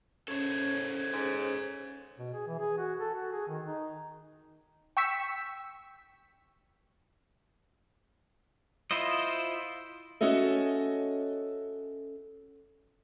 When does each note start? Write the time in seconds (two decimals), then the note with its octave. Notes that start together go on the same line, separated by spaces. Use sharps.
0.28 C#4 A4 C5 C#5 G#6
1.13 G#2
2.19 B2
2.33 G#4
2.47 E3
2.59 G#4
2.78 F#4
3.00 A4
3.14 F#4
3.32 G#4
3.48 D#3
3.66 D#4
4.97 G5 C#6 E6 B6
8.91 E4 F4 C5 D#5
10.21 C#4 F#4 A4 D#5 E5